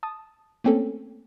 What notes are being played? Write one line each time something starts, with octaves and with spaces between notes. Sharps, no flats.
A5 D#6
A3 A#3 C4 C#4 A4